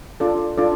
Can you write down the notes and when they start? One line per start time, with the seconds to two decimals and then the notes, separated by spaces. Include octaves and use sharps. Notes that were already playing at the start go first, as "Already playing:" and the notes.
0.20 D4 F4 A4 D5
0.58 D4 F4 A4 D5